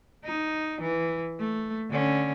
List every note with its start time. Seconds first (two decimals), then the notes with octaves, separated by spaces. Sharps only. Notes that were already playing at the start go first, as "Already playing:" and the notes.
0.24 D#4
0.81 E3
1.39 A3
1.90 D3 C#4